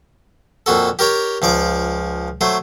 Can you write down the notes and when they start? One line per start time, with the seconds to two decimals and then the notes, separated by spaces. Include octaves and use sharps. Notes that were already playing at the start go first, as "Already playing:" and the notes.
0.66 F2 A#2 F#4 A4
0.99 G4 A#4 C#5 G5
1.42 C#2 F3 D5 D6
2.41 F#3 A3 C5